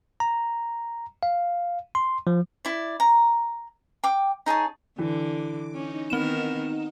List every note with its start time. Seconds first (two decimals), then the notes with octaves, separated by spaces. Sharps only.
0.20 A#5
1.23 F5
1.95 C6
2.27 F3
2.65 E4 D5
3.00 A#5
4.04 G5 D6
4.46 D#4 G#4 C#5 A5
4.99 D3 E3 D6
5.74 C#4 D#4
6.10 D#3 B3 C4 A#4 E7